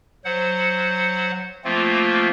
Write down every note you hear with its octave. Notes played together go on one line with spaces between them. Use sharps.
F#3 C5 F#5
F3 A3 A#3 C4 F4